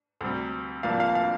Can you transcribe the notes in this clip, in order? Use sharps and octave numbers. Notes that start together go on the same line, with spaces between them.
D2 C3 G3 C4
C2 C3 F3 A#3 D4 F5
F5
F5